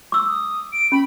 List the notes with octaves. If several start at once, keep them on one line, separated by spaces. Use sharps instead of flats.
D6 E6
D#6
D7
C#4 B5